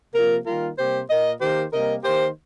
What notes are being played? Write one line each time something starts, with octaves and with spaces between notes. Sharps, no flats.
C3 F3 A#3 F4 A#4
D#3 G3 A#3 F4 A#4
C3 G3 A#3 G4 C5
A#2 A#3 A#4 D#5
D#3 A#3 G4 C5
C3 G3 A#3 A#4 D#5
D#3 A#3 G4 C5